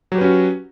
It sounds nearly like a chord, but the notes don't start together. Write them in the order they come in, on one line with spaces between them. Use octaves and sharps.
F#3 G4 B4 C#4 F#4